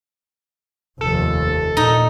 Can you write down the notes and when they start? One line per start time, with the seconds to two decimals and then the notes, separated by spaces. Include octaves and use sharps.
1.01 F1 D#2 A4
1.77 A#2 D#4